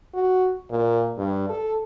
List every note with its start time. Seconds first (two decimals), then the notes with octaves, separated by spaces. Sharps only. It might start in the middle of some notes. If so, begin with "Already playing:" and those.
0.14 F#4
0.70 A#2
1.18 G2
1.49 A4